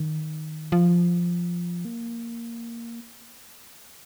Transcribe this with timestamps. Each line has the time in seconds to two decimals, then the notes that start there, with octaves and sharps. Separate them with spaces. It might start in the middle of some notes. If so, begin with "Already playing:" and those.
Already playing: D#3
0.72 F3
1.85 A#3